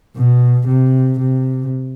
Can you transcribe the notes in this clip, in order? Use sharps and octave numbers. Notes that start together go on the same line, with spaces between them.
B2
C3
C3